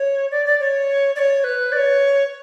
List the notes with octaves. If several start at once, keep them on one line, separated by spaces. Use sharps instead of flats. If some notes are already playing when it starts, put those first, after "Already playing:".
Already playing: C#5
D5
D5
C#5
D5
C#5
B4
D5
C#5